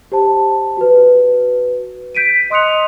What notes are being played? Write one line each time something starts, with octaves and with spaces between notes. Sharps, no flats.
G4 C5 A5
F#4 B4
G6 B6 D7 D#7
D#5 C6 D#6 F#6 C#7 F7